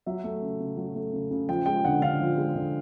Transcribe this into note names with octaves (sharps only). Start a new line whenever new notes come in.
F#3 E5
A3
C#3
C#3
F#3
A3
C#3
C#3
F3 G5
G#3 G5
D3 F#5
D3 F5
F3
G#3
D3